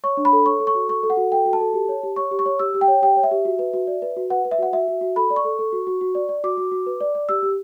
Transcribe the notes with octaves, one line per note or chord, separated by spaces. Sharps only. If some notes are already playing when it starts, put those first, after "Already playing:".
C#5 C#6
D4
B5
A4
C#5 C#6
A4
C#6
F#4
A4 C#6
A4
F#5
F#4
A4 G5
F#4
A5
A4
G4
C#5
G4
C#5 C#6
G4
C#6
C#5
G4 E6
G4
G5
C#5
G4 G5
C#5
E5
G4
F#4
B4
F#4
D5
B4
F#4
B4 F#5
B4
E5
F#4 F#5
F#4 E5
F#4
F#4
A4 B5
D5
C#6
A4
A4
F#4
F#4
F#4
D5
D5
F#4 D6
F#4
F#4
B4
D5
D5
G4 E6
G4